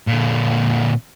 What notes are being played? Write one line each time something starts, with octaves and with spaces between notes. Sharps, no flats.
A#2 D3